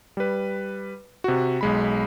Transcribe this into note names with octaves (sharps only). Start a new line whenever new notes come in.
G3 B4
C3 F#4
B1 G#3 B5